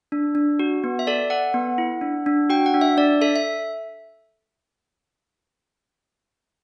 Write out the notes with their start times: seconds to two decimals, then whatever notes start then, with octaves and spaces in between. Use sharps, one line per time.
0.12 D4
0.35 D4
0.59 F#4
0.84 B3
0.99 E5
1.07 A4 D5
1.30 A4 F#5
1.54 B3
1.78 E4
2.01 D4
2.26 D4
2.49 F#4 G5
2.66 F#5
2.74 D4
2.81 E5
2.97 D4 D5
3.21 A4 E5
3.36 E5